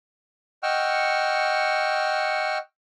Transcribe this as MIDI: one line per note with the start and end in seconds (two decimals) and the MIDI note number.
0.63 2.58 75
0.63 2.58 78
0.63 2.58 79
0.63 2.58 85
0.63 2.58 88
0.63 2.58 89